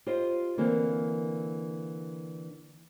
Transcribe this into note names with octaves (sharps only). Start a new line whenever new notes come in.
F4 G4 C5 D#5
D3 E3 A#3 C4